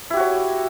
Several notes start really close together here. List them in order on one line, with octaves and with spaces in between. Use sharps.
E4 G4 F#4 C#5